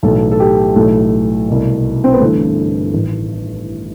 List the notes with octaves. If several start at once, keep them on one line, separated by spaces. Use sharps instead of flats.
B1 A2 E3 A4
A4
G4
B1 A2 E3 A3
C2 B2
C4
B3
G1 G2 E3 A3
A1 G2 D#3